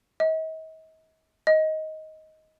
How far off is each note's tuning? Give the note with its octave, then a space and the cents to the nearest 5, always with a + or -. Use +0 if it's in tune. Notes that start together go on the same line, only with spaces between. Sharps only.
D#5 +40
D#5 +10